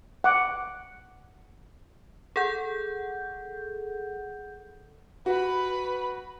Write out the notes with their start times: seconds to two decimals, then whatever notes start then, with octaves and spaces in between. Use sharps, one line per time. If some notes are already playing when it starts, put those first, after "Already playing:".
0.24 F#5 D6
2.36 G#4 A4 F#5 G6
5.26 F#4 B4 B5